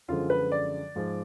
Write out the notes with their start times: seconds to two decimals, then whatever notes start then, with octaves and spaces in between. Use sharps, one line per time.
0.08 F#2 D3 F3 G#3 F4
0.30 B4
0.52 D5
0.95 G#2 F3 G#3